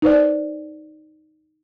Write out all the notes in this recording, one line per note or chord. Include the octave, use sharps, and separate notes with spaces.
D#4 B4 C5 D5